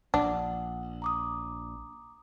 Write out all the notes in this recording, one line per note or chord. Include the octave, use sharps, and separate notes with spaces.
A#1 D4 F#5
A#5 D6 D#6